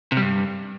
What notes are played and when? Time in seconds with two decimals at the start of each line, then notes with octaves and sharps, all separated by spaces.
0.12 C3
0.17 G3
0.22 G2